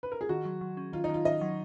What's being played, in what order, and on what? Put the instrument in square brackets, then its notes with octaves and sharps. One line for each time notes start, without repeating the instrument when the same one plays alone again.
[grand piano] B4
A#4
G#4
[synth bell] D#3 [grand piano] F#4
[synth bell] F#3
F#3
C#4
[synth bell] D#3 [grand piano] F4
[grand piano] D#4
[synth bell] D#3
[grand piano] F4
[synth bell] D#3 [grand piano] D#5
[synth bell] F#3